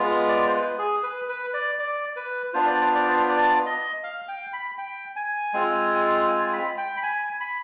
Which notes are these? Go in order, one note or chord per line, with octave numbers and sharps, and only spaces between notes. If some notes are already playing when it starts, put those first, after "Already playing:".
Already playing: G#3 B3 F4
D5
C5
B4
G#4
B4
B4
D5
D5
B4
B3 D4 F4 C5
D5
C5
D5
C5
D5
D#5
F5
G5
B5
G5
G#5
G#3 C4 F4
G#5
B5
G5
B5
G#5
B5